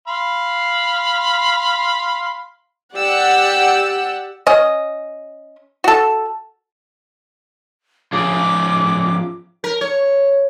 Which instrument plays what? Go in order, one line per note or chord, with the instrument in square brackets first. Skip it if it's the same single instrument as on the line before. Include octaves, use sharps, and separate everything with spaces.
[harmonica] F5 B5 C6
[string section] G4 D5 F#5 E6
[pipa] C#4 D#5
F#4 A4
[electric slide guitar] F3 C#4 G#4 [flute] D6
[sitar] A#4
C#5